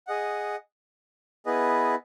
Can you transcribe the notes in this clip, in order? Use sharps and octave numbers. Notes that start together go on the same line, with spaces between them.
G#4 D#5 F#5
B3 E4 G#4 B4 D#5